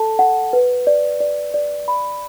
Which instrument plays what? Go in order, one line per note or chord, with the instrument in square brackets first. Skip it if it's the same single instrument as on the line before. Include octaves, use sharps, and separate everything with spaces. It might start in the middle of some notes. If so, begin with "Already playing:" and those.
Already playing: [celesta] A4 A5
F#5
B4
D5
D5
D5
B5